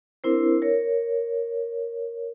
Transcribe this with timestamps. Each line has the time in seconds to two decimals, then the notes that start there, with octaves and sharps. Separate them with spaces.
0.24 C4 D4 E4 A#4 C5
0.62 A#4 C#5